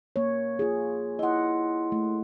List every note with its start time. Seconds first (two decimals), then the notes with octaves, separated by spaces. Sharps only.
0.16 A#3 C#5
0.59 F4 G#4
1.19 E4 D#5 F#5 C6
1.92 A3